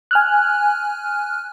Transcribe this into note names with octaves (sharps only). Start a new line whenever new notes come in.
G#5 F6 F#6